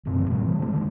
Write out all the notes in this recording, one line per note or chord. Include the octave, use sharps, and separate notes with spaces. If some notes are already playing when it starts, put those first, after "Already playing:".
E1 F#2 B2 C4
F#1 F2 D3 F3
A2 C3 F3 G3
E3 G3
D3 E3 G#3 A3
D3 D#3 G#3